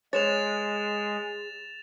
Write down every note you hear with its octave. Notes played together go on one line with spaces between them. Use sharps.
G#3 G#4 B4 C#5 A6 E7 F7